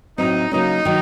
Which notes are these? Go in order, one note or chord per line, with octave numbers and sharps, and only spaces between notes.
A2 F#3 C4 D#4
C#3 F#3 A#3 C#4 D#4
D#3 F#3